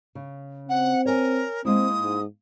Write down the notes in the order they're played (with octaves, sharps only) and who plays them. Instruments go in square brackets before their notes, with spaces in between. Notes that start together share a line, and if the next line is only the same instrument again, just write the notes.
[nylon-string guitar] C#3
[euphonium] C4 [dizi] F#5
[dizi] A#4 [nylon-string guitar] C#5 G#5
[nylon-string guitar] G#3 A#3 E4 [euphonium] C4 [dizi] D#6
[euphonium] G#2